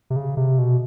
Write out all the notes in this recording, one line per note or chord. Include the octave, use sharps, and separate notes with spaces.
C3
C#3
C3
B2